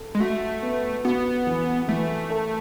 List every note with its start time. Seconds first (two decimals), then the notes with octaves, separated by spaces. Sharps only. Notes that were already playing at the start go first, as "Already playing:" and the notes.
Already playing: A4
0.15 G#3
0.20 A3 F#4
0.62 B3
1.05 B3 F#4
1.47 E3
1.88 E3 A3
2.30 A4